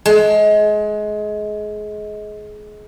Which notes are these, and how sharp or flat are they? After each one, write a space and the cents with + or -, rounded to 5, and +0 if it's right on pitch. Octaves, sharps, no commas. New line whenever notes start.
G#3 +25